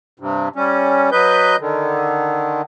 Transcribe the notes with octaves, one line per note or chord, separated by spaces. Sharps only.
G2 C3
G3 C#4
F#3 B4 D#5 G6
D3 D#3